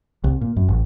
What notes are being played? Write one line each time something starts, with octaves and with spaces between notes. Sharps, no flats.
C2
A#2
F#2
A1